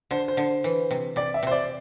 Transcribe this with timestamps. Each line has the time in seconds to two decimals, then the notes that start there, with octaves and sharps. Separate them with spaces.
0.11 D3 C5
0.28 C5
0.37 D3
0.64 E3
0.91 C3
1.16 C3 D5
1.34 E5
1.43 C3 C5
1.51 D5